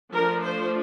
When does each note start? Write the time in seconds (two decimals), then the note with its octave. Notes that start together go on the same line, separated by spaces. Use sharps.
0.14 F3 A3 D4 A#4
0.45 C5